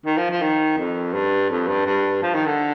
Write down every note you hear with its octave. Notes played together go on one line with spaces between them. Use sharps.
D#3
F3
F3
D#3
F2
G2
F2
G2
G2
F3
D#3
D3